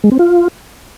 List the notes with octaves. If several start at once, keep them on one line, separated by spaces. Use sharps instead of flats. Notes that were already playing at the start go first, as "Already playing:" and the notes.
G#3
C4
F4